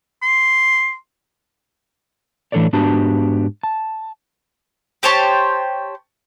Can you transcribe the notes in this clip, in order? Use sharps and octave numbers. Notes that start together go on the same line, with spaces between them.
C6
A2 E3 D4 A4 C#5 D5
G#2 B3 D4 F#4 G4 A5
A5
G4 C5 C#5 A5